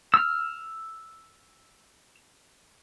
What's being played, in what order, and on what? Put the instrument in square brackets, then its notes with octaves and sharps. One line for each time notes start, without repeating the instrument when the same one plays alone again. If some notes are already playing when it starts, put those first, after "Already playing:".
[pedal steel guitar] E6 F6